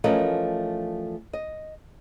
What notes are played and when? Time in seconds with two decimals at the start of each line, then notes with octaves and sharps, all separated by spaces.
0.04 E3 F3 A3 C#4 A#4 D#5
1.33 D#5